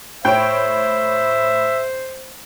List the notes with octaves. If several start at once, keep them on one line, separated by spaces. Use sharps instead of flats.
A2 C5 C#5 E5 G5 D7